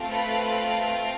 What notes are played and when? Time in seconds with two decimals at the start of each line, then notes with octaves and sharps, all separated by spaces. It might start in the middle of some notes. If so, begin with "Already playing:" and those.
Already playing: A3 C4 F4 A4
0.13 B4 B5